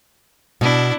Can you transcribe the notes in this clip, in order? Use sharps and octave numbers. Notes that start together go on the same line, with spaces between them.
B2 D4 E4